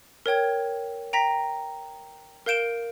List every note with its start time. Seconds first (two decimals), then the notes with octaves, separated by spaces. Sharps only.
0.26 A#4 C#5 G5 G#6
1.13 G5 A#5 A#6 B6
2.46 A#4 F5 G6 D7 E7 G7